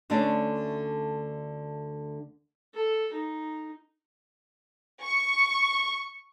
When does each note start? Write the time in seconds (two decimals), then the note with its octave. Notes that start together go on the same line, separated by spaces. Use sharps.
0.10 D2 D3 A3 C#4 D4 D5
2.74 A4
3.13 D#4
5.03 C#6